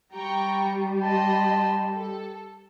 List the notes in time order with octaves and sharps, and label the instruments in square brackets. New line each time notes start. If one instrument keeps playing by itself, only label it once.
[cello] G3 [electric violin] G4 [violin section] G5 A#5 C#6
[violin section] D#5 B5 C6 [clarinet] A5
[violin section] A4